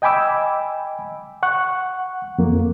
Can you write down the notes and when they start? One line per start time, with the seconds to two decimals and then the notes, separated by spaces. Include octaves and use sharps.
0.02 D#5 G5 G#5 B5 D6 E6
1.43 F#5 C#6 F#6
2.38 F2 A#3